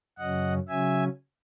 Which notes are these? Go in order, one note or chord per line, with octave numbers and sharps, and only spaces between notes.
F#2 C#3 F#3 C#4 D#5 F#5
C#3 F#3 C#4 E5 G#5